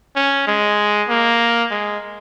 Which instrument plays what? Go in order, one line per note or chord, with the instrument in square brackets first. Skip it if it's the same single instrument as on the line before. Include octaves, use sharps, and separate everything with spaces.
[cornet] C#4
G#3
A#3
G#3